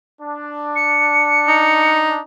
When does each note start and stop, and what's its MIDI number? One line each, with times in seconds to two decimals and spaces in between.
0.22 2.22 62
0.76 1.98 97
1.48 2.20 63